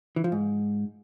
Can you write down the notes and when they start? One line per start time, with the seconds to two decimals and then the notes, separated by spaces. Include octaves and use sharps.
0.16 E3
0.24 F3
0.32 G#2